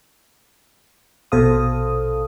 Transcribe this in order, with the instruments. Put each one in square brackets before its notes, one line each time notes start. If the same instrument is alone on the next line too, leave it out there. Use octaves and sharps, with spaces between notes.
[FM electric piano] A#1 B2 A4 C5 F5 D#6